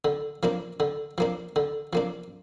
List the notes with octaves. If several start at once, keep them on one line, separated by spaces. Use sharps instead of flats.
D3
F3 A#3 D4
D3
F3 A#3 D4
D3
F3 A#3 D4